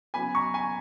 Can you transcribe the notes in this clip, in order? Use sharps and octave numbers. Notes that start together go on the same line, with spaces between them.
C#3 F#3 B3 G#5 B5
A#5 C#6
G#5 B5